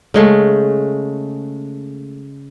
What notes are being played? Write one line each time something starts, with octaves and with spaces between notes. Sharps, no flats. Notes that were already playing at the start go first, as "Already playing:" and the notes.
C#3 G#3 A3